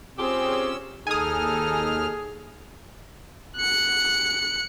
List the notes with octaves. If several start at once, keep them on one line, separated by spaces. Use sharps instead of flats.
C4 C#4 F4 G4 G#4 E6
D#2 D#4 G#4 A4 G#5 D#6 F6
F#6 C#7